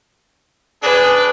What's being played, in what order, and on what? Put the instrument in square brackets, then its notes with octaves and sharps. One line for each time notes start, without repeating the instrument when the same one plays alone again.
[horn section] D4 G#4 [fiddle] B4